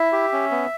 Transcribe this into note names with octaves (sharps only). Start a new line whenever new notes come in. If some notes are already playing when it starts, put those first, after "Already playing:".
Already playing: E4 E5
G4
C#4
B3